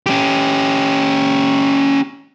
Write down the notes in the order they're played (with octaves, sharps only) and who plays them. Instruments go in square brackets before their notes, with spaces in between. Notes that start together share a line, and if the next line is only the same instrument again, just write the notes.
[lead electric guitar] C#4 G4